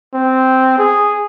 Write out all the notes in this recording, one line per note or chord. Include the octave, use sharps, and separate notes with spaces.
C4
G#4